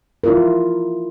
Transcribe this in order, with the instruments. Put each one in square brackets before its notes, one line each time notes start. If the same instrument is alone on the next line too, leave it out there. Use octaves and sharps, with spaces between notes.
[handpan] E4 F4 A#4